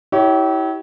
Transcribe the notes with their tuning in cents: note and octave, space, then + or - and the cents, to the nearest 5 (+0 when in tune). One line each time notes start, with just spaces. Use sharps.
E4 -30 G4 -35 C#5 +10